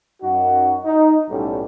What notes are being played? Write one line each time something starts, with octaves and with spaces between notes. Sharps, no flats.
F#2 D#4 F#4
D#4
B1 A2 G3 C#4 G4 A4